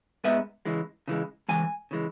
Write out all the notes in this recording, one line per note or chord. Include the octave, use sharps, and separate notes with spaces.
G#2 G#3 B3 B4 E5
C#3 E3 G#3
C#3 E3 G#3
C#3 E3 G#3 G#5
C#3 E3 G#3